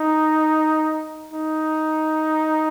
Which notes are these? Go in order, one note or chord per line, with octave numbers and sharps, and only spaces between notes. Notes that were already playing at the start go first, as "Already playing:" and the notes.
Already playing: D#4
D#4